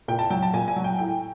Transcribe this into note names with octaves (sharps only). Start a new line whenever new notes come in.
A#2 G5
A5
F#3 G5
A5
A#2 G#5
G#5
F#3
G5
A2 G5